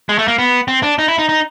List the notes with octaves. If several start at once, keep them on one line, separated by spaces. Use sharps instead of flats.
G#3
A3
A#3
B3
C4
D4
D#4
E4
D#4
D#4